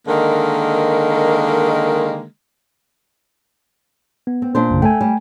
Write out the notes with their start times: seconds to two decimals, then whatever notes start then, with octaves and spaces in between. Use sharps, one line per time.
0.07 D3 D#3 G#3 A#3
4.27 B3
4.42 C4
4.55 A#2 D4 C5
4.70 A#1 F#2 C#3
4.82 A3 G5 G#5
5.01 G3